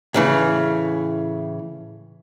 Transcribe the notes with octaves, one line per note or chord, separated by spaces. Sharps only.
A2 C#3 E3